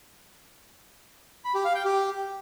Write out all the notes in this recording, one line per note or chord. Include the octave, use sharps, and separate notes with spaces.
B5
G4
F5
G5
G4